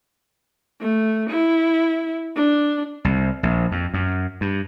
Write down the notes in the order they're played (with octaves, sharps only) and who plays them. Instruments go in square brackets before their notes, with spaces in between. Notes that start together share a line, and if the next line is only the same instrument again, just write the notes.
[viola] A3
E4
D4
[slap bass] C2
A#1
F2
F#2
G2